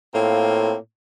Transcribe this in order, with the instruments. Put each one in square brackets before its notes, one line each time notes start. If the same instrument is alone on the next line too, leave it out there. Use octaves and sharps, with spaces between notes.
[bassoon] A2 [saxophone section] A#3 C4 F4